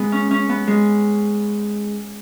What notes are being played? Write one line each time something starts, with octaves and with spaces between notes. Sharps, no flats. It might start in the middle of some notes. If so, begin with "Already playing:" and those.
Already playing: G#3 B3
C#4
C#4
B3
G#3